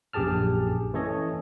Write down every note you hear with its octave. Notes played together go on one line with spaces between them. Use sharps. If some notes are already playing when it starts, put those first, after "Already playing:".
A#1 F#2 G4 G#4 A5 F6
E3 A3 C#4 A4 C#5 D#5